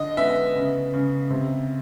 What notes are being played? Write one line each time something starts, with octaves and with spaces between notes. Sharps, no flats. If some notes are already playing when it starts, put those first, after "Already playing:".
Already playing: D3 D#5
B3 E5
C#3
C#3
C3